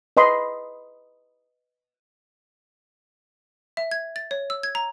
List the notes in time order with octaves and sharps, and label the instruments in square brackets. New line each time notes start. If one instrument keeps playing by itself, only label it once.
[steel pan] B4 D#5 B5 C6
[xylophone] E5
G#6
A6
C#5
E6
G#6
A#5